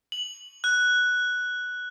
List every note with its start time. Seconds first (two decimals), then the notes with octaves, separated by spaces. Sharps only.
0.12 F#7
0.64 F#6